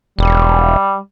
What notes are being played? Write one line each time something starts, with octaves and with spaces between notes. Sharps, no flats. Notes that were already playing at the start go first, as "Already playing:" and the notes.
E1 G3